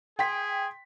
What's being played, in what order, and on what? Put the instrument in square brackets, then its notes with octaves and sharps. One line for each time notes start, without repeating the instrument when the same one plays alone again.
[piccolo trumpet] G#4 [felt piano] G5 C6 B6